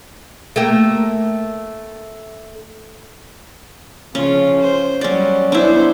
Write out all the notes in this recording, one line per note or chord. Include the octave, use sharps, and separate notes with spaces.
A3 A#3 G4
C#3 F3 C#4 F4
C5
F#3 G3 C#4 D5
B3 D4 E4 C5